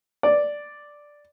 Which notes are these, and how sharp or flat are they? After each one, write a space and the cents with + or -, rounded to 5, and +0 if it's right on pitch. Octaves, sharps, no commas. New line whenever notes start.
D5 +0